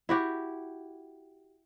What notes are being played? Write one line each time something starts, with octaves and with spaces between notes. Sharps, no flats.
E4 F#4 G4